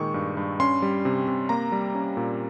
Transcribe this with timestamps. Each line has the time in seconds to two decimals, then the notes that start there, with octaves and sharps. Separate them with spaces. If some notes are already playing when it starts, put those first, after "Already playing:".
Already playing: A#2 D#3 G#3 C#6
0.14 G2
0.37 G2
0.60 C#4 C6
0.82 G3
1.05 C3
1.28 C3
1.49 A#3 A#5
1.72 G3
1.95 C#4
2.17 A#2